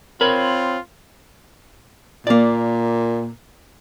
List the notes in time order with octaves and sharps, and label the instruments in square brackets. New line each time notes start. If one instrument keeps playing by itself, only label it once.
[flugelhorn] C4 [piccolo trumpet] F4 [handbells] A#4 [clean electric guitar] C#5 B5
[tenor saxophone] A#2 [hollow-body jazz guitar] A#3 D5